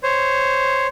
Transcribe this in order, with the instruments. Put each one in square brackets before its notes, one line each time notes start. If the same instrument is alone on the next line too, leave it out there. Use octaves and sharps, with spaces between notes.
[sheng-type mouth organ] C5 C#5